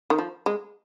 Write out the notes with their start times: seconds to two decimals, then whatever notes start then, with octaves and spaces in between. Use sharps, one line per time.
0.10 D#3
0.19 F3
0.46 G#3